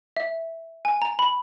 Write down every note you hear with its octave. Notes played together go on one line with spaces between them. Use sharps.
E5
G#5
A#5
B5